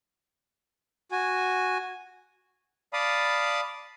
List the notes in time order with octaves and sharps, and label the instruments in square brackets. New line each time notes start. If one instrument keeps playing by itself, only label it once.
[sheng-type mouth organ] F#4 G#5
D5 F5 A5 B5 D#6